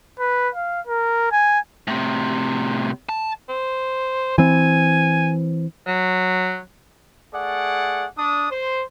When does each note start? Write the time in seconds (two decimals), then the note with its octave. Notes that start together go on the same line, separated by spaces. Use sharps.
0.19 B4
0.55 F5
0.87 A#4
1.32 G#5
1.87 A2 C3
3.09 A5
3.49 C5
4.38 E3 C4 G#5
5.87 F#3
7.34 A3 G#4 D5 F#5
8.18 D4 D#6
8.51 C5